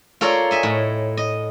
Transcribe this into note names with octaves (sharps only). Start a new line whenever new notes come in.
F4 A4 A#4 C#5 D5 F5
D#5 E5 G#5
A2
D#5